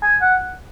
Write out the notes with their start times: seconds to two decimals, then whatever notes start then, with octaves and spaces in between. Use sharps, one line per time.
0.02 G#5
0.22 F#5